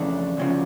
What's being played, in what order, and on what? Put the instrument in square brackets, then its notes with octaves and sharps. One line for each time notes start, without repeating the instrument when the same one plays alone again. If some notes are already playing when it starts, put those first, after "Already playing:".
Already playing: [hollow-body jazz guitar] F2 C#3 E3 A3 D4 [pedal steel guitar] D5
[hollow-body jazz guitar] D2 C#3 F3